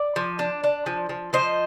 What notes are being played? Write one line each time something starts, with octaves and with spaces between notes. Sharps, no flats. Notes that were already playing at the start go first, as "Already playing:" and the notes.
Already playing: D5
F3
D4
D4
F3
F3
F3 C5 D#5